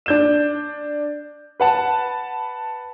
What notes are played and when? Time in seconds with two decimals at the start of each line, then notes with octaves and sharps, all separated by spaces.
0.06 D4 G6 E7
1.60 B4 F#5 A5